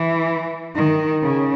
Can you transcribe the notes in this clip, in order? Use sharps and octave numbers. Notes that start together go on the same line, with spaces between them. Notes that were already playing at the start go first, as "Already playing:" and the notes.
Already playing: E3
D#3
C#3